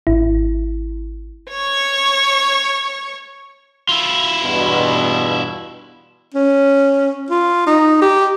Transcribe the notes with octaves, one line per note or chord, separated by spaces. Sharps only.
G#1 E4
C#5 C#6
E4 F4
E2 G2 B2
C#4
F4
D#4
G4